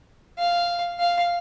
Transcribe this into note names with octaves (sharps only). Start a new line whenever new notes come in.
F5
F5